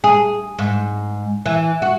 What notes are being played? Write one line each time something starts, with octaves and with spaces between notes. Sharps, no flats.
G#4
G#2
E3
F#4